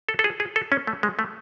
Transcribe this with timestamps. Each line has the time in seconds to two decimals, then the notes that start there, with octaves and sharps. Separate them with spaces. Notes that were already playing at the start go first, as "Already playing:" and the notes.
0.09 A4
0.19 A4
0.24 G#4
0.40 G#4
0.56 A4
0.72 C#4
0.87 A3
1.03 G#3
1.19 A3